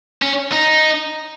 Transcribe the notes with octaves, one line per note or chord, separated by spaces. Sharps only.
C#4
D#4